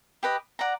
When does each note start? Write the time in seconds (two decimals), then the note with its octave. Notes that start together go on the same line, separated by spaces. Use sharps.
0.23 G4 B4 D#5
0.59 D5 F#5 A#5